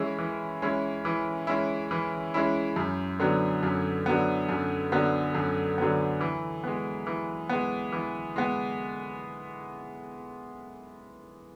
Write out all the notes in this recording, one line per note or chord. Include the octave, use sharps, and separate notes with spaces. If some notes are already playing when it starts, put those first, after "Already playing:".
Already playing: E3 G#3 C#4 E4
E3
G#3 C#4 E4
E3
G#3 C#4 E4
E3
G#3 C#4 E4
F#2
D3 F#3 B3
F#2
D3 F#3 B3
F#2
D3 F#3 B3
F#2
D3 F#3 B3
E3
G#3 B3
E3
G#3 B3
E3
G#3 B3